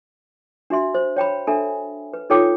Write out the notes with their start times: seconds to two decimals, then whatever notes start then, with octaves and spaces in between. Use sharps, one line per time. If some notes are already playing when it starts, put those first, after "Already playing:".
0.70 D4 F#4 E5 C6
0.95 C5
1.16 C#5 G5 A#5 B5
1.47 D4 A4 E5 G#5 A#5
2.13 B4
2.30 D#4 F4 A4 C#5 G5 D6